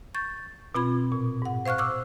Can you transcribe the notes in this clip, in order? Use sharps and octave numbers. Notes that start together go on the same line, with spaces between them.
C#6 G6 A6
B2 C4 F4 B5 G#6
A#2
G#2 F#5
C5 F5 C#6 F6 F#6
C#6 D6 E6 F6